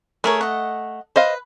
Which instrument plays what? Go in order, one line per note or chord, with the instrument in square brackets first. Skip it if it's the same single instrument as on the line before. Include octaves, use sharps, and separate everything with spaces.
[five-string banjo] A3 [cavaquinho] G#4 A#4 C#5
[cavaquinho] D#5 F#5
[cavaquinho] B4 [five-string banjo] C5 D#5 F5